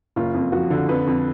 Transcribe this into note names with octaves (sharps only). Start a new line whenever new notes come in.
F#1 F4
F2
F3 F#4
D3
F2 B4
F2